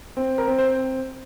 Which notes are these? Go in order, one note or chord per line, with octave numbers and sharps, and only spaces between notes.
C4
A#4
C4
C5